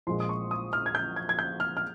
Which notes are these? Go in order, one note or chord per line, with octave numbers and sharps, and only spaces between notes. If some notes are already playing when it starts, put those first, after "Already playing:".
A#1 A#2 G#3 C6
D#6
C#6
D#6
F6
G#6
G6
G#6
G#6
G6
F6
F6